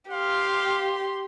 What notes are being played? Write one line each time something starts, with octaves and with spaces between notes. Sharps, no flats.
G4 F5 C6